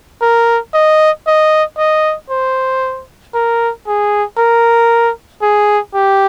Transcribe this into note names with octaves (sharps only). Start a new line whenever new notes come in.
A#4
D#5
D#5
D#5
C5
A#4
G#4
A#4
G#4
G4